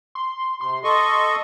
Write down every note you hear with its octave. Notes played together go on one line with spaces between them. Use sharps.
C6
C3 C6
A4 D#5 C#6